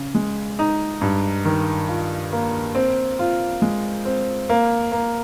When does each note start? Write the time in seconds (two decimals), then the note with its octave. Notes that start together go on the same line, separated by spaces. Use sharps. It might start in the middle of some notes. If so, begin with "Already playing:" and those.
Already playing: C#3
0.15 G#3
0.59 D#4
1.01 G2
1.45 D#3
1.88 F4
2.32 A#3
2.75 C4
3.19 F4
3.62 G#3
4.05 C4
4.49 A#3
4.92 A#3